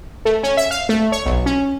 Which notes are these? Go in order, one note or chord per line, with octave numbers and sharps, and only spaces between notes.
A3
C#4
E5
F5
A3
C#5
B1
C#4